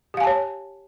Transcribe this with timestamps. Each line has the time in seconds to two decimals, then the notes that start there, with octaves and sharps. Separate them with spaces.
0.14 G4
0.17 F5
0.20 G#5
0.24 A5
0.27 C#5